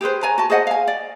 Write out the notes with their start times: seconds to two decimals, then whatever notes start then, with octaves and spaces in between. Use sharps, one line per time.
0.01 G4 G#4 B4 C5
0.23 C#5 G#5 A#5
0.38 F#4 A5
0.50 G#4 C5 D#5 F#5
0.67 F5 G#5
0.87 D5